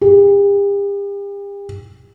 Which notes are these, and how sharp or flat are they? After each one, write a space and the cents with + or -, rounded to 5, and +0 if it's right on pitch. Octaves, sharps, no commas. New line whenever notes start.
G4 +40